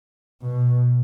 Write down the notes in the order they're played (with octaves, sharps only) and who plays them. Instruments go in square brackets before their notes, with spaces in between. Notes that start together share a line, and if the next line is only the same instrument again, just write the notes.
[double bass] B2